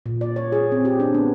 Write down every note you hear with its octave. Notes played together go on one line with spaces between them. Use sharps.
A#2
D5
C#5
G#4
C4
G4
D4
B3